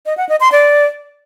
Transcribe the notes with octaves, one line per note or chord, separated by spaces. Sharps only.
D#5
F#5
D#5
C6
D5